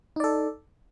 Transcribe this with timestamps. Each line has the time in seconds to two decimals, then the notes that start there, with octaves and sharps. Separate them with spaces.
0.16 D#4
0.20 D5
0.24 A4